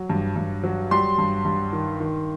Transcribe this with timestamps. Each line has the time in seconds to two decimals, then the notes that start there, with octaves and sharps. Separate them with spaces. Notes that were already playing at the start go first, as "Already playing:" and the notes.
Already playing: F#3
0.10 G2
0.36 G2
0.64 F#3
0.91 G3 C6
1.18 G2
1.45 G2
1.72 D#3
2.00 D#3